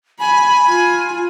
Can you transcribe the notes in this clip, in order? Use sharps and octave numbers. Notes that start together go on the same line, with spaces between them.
G#5 B5
F4